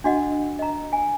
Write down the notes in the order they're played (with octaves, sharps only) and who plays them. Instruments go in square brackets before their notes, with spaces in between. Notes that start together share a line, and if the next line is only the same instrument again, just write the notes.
[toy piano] D4 F#4 D#5 F#5
D#5 A#5
G#5